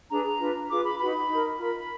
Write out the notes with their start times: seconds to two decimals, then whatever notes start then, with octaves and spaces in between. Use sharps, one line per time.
0.10 D4 G#4 B4 A#5
0.40 D4 F4 B4
0.70 F4 G#4 B4 D6
0.84 B5
1.00 D#4 F#4 B4 B5
1.29 D#4 A#4
1.59 F4 A#4 B5